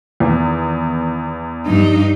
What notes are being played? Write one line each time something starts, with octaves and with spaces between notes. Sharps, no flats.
E2 D#3 E3
G2 F3 G3 D4 D#4